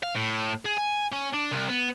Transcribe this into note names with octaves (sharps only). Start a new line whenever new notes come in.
F5
A2
G#4
G#5
C#4
D4
C2
B3